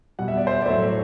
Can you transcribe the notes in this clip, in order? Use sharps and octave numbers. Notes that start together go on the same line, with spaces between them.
B2 G3 F#5
E5
D5
C5 E5
D5
A2 F#3 A3 C5 E5